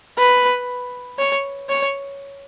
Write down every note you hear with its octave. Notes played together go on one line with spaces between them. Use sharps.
B4
C#5
C#5